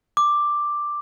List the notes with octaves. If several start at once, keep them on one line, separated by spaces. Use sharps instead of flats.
D6